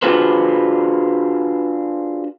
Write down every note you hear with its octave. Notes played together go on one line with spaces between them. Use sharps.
D4 F4 F#4 G#4 B4 C5